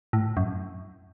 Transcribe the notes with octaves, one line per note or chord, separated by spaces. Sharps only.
A2
F#2